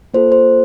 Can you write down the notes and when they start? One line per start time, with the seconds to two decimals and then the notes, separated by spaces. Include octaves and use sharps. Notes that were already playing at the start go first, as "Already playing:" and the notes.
0.14 A#3 F4 A4 C5
0.32 C5